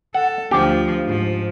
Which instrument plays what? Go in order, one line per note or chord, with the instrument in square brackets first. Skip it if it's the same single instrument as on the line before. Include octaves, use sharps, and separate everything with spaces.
[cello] A4 [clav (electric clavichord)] F#5
[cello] D2 F3 [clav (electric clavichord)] G4
[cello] G#2 F3